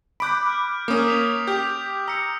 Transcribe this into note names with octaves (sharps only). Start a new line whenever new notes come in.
B5 D6 F#6 G6 D7
F6
A#3 C#4 D6 D#6
B6 F7
G4 G6 B6
A#5 E6 C#7